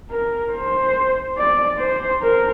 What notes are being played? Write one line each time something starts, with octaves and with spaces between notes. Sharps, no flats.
A#4
C5
D5
C5
A#4